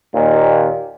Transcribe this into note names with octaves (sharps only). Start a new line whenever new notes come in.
D#2 A#2